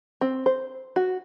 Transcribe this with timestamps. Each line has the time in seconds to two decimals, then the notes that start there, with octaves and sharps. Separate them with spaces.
0.21 C4
0.46 C5
0.96 F#4